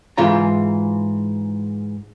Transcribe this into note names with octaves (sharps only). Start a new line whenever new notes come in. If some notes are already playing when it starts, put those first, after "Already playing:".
G#2 E3 F4 A#5